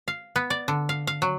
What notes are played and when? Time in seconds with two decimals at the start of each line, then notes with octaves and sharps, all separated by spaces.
0.08 F5
0.36 B3
0.50 D5
0.68 D3
0.89 F5
1.07 F5
1.22 F#3